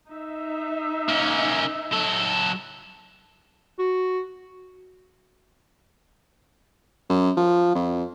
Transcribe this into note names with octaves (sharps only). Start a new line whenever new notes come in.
D#4 E5
A#3 C#4
F#3 A4
F#4
F#2
F3
F2